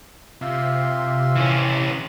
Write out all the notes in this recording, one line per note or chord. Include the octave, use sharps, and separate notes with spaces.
C3 F4 E5 C6
E3 C#4